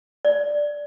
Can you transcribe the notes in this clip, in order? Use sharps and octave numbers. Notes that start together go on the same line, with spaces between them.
D5